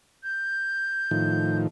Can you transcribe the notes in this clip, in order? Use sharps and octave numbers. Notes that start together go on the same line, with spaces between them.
G6
A2 D#3 F3